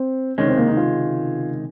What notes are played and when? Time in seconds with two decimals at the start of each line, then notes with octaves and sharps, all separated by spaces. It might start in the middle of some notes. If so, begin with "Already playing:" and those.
Already playing: C4
0.38 C#2 C3 D#3 G#3 C#4
0.48 C4
0.57 A#3
0.68 D#4
0.77 F4